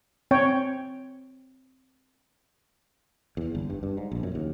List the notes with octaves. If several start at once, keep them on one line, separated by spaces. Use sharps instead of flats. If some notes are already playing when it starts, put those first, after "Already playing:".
C4 C#5 G5
E2
G1
G2
G2
G#2
A#1
F#2
D#2